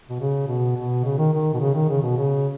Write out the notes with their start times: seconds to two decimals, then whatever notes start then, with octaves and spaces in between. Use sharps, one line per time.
0.09 B2
0.20 C#3
0.48 B2
0.76 B2
1.04 C#3
1.17 D#3
1.33 D#3
1.53 B2
1.60 C#3
1.75 D#3
1.89 C#3
2.02 B2
2.17 C#3